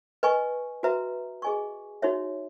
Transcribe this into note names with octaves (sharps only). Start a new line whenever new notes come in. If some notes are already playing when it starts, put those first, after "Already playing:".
B4 D#5 G#5 C#6
F#4 B4 E5 A#5
G#4 D#5 G#5 C#6
D#4 F#4 C#5 E5